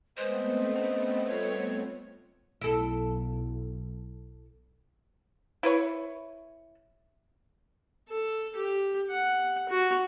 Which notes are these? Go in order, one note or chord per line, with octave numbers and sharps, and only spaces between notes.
G#3 A3 B3 C4 B4 C5 D#5 C6
C#4
G3 F4 A4 C#5
B1 E4 A4
E4 B4 C#5
A4
G4
F#5
F#4